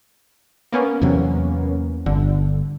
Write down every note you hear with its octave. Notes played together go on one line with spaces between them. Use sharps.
A#3 B3 C#4
E2 C3 F#3
G1 D3